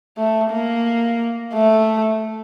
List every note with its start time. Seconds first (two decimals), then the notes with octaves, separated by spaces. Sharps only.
0.17 A3
0.51 A#3
1.53 A3